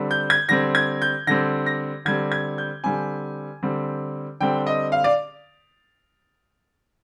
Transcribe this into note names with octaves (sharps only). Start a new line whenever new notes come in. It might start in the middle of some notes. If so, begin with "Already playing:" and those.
Already playing: D3 G3 C4
G6
G#6
D3 G3 C4 A#6
G#6
G6
D3 G3 C4 A#6
A#6
D3 G3 C4 G#6
G#6
G6
D3 G3 C4 G#5
D3 G3 C4
D3 G3 C4 G5
D#5
F5
D5